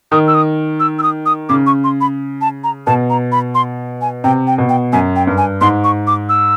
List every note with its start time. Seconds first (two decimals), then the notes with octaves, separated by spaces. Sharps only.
0.12 D#3 D#6
0.28 E6
0.34 D#6
0.80 E6
0.99 E6
1.03 D#6
1.26 D#6
1.49 C#3 D6
1.67 C#6
1.84 C6
2.01 B5
2.41 A5
2.64 A#5
2.87 B2 A5
3.10 A#5
3.32 B5
3.55 C6
4.01 G#5
4.24 C3 G5
4.47 G5
4.58 B2
4.69 G5
4.93 F#2 G#5
5.16 G5
5.27 G2
5.38 G#5
5.61 G#2 C6
5.84 C#6
6.07 D6
6.29 E6